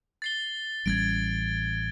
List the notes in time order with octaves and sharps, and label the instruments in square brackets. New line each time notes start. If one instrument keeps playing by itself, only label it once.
[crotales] A6 C7 G7
[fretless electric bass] A1 G3 C#4 [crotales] G#6 A6 D7